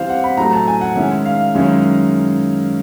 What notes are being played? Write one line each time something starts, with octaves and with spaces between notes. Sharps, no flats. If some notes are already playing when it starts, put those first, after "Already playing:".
Already playing: C3 E3 G3 C5 F5
F#5
B5
A2 F#3 A3 A#5
A5
G#5
F#5
D#3 G#3 C#4 E4
F5
F#2 D#3 G#3 C#4 E4